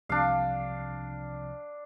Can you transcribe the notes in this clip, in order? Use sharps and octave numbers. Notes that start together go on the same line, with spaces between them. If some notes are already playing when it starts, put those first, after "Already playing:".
C2 C3 F3 D4 F5